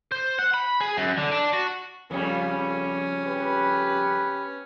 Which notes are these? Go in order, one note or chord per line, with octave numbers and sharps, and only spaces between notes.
C5
F#5
B5
G#4
F#2
D3
D4
F#4
F2 C#3 G3 C#4
G4 B4